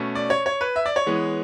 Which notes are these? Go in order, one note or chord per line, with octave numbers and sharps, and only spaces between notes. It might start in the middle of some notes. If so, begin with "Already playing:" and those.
Already playing: B2 A3 C#4
D5
C#5
C#5
B4
E5
D5
C#5
E3 G#3 B3